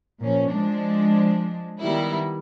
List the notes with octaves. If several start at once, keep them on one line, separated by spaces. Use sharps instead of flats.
A#2 F3 C#4
F3 G#3 D4
D#3 G3 B3 E4